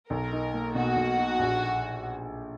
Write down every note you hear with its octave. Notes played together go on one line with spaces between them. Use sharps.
B1 A#4
D#4
A#3
B2 F#4
B1
D#4
A#1